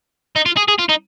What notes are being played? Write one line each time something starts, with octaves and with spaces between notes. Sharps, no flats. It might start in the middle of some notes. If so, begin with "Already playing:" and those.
D#4
F4
G#4
G#4
F4
D#4